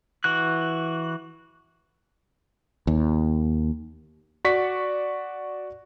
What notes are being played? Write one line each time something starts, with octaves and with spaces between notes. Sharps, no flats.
E3 F#4 F#6
D#2
F#4 D5 C#6 B6